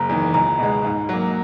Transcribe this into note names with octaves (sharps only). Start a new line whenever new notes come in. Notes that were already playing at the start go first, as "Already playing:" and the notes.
Already playing: F#1 A#5
E2 D#3
C#2 A#5
B2 G#3
G#2
F#3 A#3